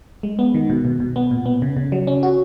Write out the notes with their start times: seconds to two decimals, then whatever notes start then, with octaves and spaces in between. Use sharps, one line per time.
0.23 G#3
0.39 B3
0.54 D#3
0.70 B2
0.85 B2
1.00 B2
1.16 B3
1.31 A#2
1.46 B3
1.62 C#3
1.77 C#3
1.92 F#3
2.07 C#4
2.23 F#4